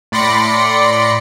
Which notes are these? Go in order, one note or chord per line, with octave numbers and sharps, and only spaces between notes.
A2 D5 B5 C6 A#6 C#7